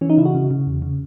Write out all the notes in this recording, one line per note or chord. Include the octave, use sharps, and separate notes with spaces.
E3 C#4
D#4
C#3 E4
F#4
C#3
C#3
E2
C#3